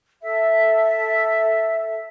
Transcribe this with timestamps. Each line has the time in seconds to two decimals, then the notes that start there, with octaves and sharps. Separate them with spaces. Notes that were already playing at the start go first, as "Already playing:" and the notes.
0.22 A4 E5